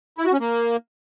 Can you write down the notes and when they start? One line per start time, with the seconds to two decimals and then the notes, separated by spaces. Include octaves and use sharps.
0.18 E4
0.25 F#4
0.33 C#4
0.40 A#3